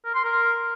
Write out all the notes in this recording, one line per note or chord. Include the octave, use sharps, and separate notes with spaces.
A#4
C6
A#4